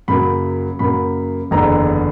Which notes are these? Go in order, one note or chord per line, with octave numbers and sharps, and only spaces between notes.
F#2 C#3 F#3 A#3 B5
F#2 C#3 F#3 A#3 B5
F#1 E2 D3 A#5